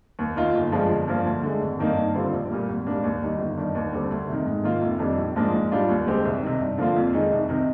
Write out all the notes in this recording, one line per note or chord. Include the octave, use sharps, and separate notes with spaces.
D#2
D#3 A#3 F4
G1
G2 F3 G#3
G1
G2 F3 A#3
D2
D3 G#3
G#1
G2 D#3 A#3 D#4
G2
D3 G3 C4 F4
A#1
A#2 G3 A#3
G#1
G#2 G3 A#3 D4
D#2
D#3 G3
G1
G2 D#3
D#2
D3 G3 C4 G4
D2
C3 D#3
G#2
D#3 A#3 F4
F1
F2 D#3 G3 D4
A#1
G#2 F3 A#3 D4
G#2
G3 D4 F4
D#2
D3 G#3 C4 G4
C2
C3 D#3
G2
D3 F3 A#3 F4
F2
D#3 G#3 D#4
C2
C3 D#3